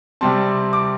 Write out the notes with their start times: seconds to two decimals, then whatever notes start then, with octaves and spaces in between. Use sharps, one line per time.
0.21 C3 G3 C4 A5
0.73 D6